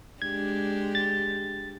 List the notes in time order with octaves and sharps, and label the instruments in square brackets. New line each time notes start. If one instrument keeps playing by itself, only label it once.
[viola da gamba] G#3 D4 G4 [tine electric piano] G#6
[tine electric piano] A6